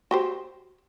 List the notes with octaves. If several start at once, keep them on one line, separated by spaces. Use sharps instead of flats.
F#4 G4 C5